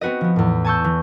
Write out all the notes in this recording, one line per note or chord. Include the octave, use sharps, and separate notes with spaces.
B3 C4 F#4 B4 D#5
F3 B3
E2 A2
G#5 A5 C#6 E6 G6
E3